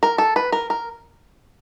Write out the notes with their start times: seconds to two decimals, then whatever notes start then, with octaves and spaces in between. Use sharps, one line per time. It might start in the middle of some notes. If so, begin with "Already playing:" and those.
0.03 A#4
0.18 A4
0.36 B4
0.52 A#4
0.70 A#4